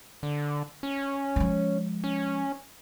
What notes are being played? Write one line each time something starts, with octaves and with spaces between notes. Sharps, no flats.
D3
C#4
F3 G#3
C#4